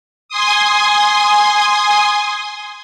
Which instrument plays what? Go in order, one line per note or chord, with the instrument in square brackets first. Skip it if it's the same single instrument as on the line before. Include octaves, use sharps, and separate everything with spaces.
[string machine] G#5 C6 D#6